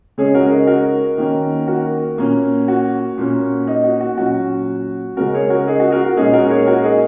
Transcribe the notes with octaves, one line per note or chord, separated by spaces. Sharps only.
C#3 G#3 C#4 G#4 C#5
F#4 A#4
D#4 G#4
F#4 A#4
D#3 A#3 C#4
F#4 A#4
A#2 A#3 C#4
F#4
A#2 A#3 C#4
D#4
F#4
F#4
A#2 F#3 C#4 F#4
C#3 G#3 C#4 F#4 A#4
G#4 C#5
F#4 A#4
D#4 G#4
F#4
F#4 A#4
F#4
A#2 G#3 C#4 D#4 G#4
F#4 A#4
G#4 C#5
F#4 A#4
D#4 G#4